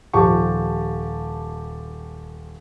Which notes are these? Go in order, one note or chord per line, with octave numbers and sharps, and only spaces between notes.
D#1 F3 G4 A5 C#6